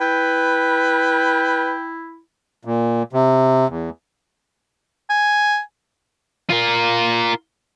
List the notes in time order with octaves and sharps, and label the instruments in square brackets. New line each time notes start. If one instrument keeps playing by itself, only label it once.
[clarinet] E4 [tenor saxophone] B4 [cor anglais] G5
[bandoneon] A#2
C3
E2
[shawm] G#5
[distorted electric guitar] F4 A#4